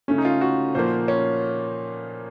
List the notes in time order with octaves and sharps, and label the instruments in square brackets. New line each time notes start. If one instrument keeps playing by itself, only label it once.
[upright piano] C#3 A3 C#4
[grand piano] D#4
F4
F#4
[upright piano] A#2 F3 A#3 [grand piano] C5
[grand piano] C#4